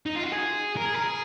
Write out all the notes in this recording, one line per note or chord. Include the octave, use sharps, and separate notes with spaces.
D#4
F4
F#4
G#4
A#4
G#4
A#4
G#4